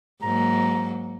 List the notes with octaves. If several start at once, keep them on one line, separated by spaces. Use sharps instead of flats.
G#2 F#3 A#3 A#5